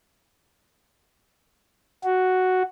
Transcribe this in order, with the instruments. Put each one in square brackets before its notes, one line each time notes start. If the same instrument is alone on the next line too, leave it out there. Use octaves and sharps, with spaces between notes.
[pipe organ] F#4